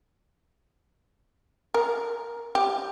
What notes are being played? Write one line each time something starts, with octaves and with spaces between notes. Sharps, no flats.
A#4
G4